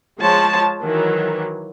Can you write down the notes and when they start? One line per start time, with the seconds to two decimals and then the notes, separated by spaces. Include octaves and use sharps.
0.19 F3 G#3 C#5 A5
0.82 D#3 E3 F#3